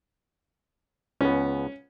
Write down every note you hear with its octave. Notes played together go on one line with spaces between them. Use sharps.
C#2 B3 C#4